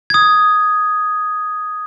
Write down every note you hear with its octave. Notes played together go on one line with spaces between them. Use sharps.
D#6 G#6